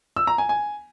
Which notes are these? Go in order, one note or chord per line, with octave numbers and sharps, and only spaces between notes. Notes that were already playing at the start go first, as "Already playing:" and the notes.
E6
A#5
G#5
G#5